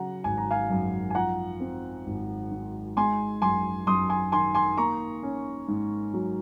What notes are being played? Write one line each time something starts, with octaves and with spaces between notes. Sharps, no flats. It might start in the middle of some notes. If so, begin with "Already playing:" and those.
Already playing: C#3 F#3 F#5 A#5
G#1 G#5
A#5
F5 G#5
F#2
G#5
F3 F#5 A#5
C4
G#1
G#2
G#3 G#5 C6
F#2 G#5 C6
F#2 C6 D#6
G#5 C6
D#3 G#5 C6
G#5 C6
A#3 A#5 C#6
C#4
G#2
F#3